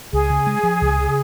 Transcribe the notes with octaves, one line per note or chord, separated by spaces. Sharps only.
C#2 G#4
C#3
G#3
F3
C#2
C#3